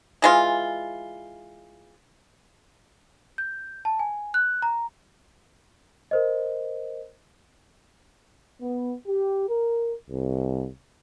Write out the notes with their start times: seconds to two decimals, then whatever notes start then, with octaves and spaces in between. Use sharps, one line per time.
0.22 E3 G#3 F4
3.38 G6
3.85 A5
3.99 G#5
4.34 F#6
4.62 A#5
6.11 A#4 C5 D#5
8.61 B3
9.07 G4
9.48 A#4
10.10 C2